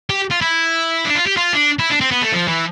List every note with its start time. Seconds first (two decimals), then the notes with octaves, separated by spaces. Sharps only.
0.10 G4
0.31 F4
0.41 E4
1.05 D4
1.15 F4
1.27 G4
1.37 F4
1.53 D4
1.79 E4
1.90 D4
2.01 C4
2.11 B3
2.22 A3
2.32 F3
2.48 E3